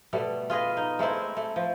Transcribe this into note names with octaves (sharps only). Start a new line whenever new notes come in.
B2 G3 A3
F4 G#4 B4 D#5
D#4
G#3 A3 C4 E4
A3
F3